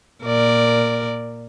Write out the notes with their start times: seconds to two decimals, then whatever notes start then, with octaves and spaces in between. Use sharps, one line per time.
0.24 A#2 A#4 D5